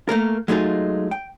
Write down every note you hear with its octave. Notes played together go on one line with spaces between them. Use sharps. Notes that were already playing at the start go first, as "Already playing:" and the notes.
A3 A#3 A#4
F#3 G#3 A3 D#4 F4
G5